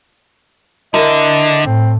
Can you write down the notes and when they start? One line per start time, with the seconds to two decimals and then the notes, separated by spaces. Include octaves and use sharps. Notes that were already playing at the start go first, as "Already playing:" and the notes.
0.94 D3 E4 A#4 D#5
1.65 A2 C4